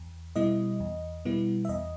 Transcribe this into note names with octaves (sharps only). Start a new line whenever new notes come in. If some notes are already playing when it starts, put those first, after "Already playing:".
Already playing: E2
B2 G3 B3 E4 D#5
E2
B2 G3 B3 E4
E5
E2 D#5